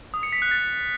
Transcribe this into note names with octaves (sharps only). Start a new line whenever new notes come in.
D#6
C#7
B6
F#6
A6